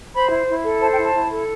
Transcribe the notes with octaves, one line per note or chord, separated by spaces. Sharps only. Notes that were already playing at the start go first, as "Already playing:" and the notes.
C5 B5
E4
E4
A4
C5 A5
G5
E4
A5
E4
A4